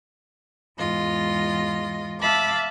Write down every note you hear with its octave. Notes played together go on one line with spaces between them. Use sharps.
E2 G#2 F4 D#5
E5 F5 A5 B5 D6